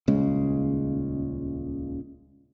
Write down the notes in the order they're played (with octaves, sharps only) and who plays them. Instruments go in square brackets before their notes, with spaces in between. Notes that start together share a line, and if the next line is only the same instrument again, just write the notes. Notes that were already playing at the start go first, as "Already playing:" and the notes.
[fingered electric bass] D#1 C#2 C#3 G#3